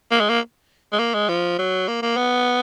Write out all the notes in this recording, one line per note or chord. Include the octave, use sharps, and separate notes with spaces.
A#3
G#3
A#3
G#3
A#3
G#3
F3
F#3
A#3
A#3
B3